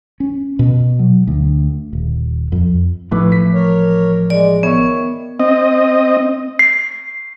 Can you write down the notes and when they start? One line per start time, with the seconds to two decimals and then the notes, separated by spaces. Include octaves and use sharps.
0.20 C#4
0.59 B2
0.99 F#3
1.27 D2
1.93 D#1
2.52 F2
3.11 A1 A2 F3 A3 B4 D6
3.32 B6
3.54 A#4 C#5
4.30 G#3 D5
4.63 D#3 B3 C#5 E5 C#6
5.40 C4 D#5
6.59 C7